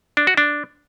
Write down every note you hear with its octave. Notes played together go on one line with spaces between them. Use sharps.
D4
F#4
D4